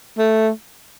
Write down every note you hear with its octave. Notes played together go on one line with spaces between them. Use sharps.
A3